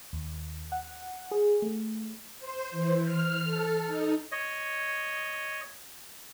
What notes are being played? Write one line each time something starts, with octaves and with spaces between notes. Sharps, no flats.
D#2
F#5
G#4
A3
C5
E3
F6
A4
D#4
C#5 D#5